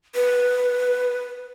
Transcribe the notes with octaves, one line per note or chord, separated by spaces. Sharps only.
B4